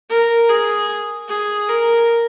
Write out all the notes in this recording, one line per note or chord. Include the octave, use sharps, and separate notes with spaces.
A#4
G#4
G#4
A#4